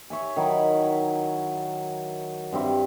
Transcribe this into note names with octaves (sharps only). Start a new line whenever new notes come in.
C#5 E5 G#5
D#3 F#3 E4 B5
G2 C4 E4